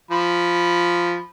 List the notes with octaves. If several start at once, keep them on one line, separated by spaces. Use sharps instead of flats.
F3 B5